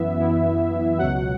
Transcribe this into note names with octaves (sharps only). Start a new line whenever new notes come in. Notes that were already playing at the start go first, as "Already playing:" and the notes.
Already playing: F#2 E3 B3 E4 E5
F#2 E3 B3 E4
C#2 B2 F#3 F#5